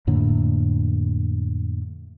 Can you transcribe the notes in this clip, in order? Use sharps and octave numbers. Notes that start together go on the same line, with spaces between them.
F2 A2 D3 A#3